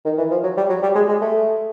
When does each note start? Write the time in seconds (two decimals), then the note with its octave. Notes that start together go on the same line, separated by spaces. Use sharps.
0.05 D#3
0.18 E3
0.31 F3
0.43 F#3
0.57 G3
0.69 F#3
0.82 G3
0.95 G#3
1.08 G#3
1.21 A3